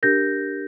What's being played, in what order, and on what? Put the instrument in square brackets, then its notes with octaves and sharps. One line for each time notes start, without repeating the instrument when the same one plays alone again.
[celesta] D4 G4 A#4 G6 A#6